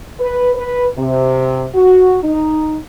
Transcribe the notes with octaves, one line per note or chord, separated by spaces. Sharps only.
B4
B4
C3
F#4
D#4